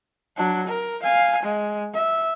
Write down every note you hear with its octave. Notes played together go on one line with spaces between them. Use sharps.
F#3 D4
A#4
F5 G#5
G#3
E5